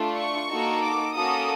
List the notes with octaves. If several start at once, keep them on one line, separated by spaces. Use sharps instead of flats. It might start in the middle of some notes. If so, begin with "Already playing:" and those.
Already playing: A3 D4 F4
C#6
A#3 D#4 F#4 A4
D6
A#3 C#4 F#4 A4 D#6